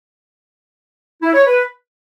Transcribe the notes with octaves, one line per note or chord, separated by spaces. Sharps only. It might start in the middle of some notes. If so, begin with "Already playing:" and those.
E4
C#5
B4